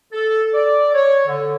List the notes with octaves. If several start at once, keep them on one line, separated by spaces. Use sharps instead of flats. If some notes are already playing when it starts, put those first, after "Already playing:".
A4
D5
C#5
D3